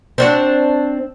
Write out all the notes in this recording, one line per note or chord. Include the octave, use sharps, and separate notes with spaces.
C4 D4 F#4